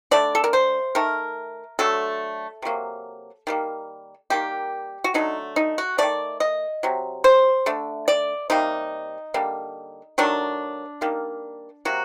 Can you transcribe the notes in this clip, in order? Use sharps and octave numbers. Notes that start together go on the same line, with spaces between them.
D3 A3 D5
A4
A#4
C5
D#3 A3 A#4
D3 F#3 A3 A4
C3 F#3 A#3
D#3 G3 A#3
D#3 G3 A#3 G4
F#4
D3 F#3 A3 D#4
D#4
F#4
D#3 A3 D5
D#5
C3 F#3
C5
D3 A3
D5
C3 G3 A#3 D#4
D3 G3 A#3
D#3 F#3 A3 D4
D#3 G3 A#3
C3 F#3 A#3 F#4